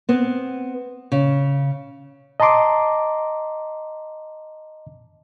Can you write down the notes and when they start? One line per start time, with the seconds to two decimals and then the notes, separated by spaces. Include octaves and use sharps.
0.09 B3 C4
1.12 C#3
2.40 D#5 A5 A#5 C6 D6